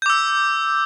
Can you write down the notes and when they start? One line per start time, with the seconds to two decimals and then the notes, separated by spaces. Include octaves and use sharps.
0.02 G6
0.06 D6
0.10 E6